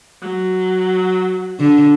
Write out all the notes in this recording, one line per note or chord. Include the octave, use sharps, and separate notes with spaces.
F#3
D3